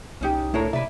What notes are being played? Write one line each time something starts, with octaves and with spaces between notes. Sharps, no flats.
C2 C#4 D#4 G4
A2 D4 E4 A4 A#4 C#5
C3 E4 B4 D5 E5